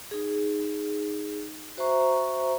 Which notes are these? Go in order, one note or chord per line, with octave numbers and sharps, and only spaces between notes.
D#4 G#4
F#4 C5 E5 A#5 C#6